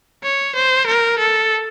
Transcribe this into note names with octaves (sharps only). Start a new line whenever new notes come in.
C#5
C5
A#4
A4